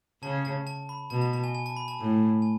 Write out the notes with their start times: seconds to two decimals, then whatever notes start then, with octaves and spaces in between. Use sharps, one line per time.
0.23 C#3 A5
0.45 A5
0.67 A5
0.89 B5
1.10 B2 A5
1.21 A5
1.33 A5
1.44 G#5
1.55 G#5
1.66 A5
1.77 B5
1.88 A5
1.99 A2
2.42 G#5